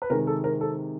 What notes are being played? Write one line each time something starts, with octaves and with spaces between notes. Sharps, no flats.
B4
C3 D#3 G#3 A#4
A4
A#4
A4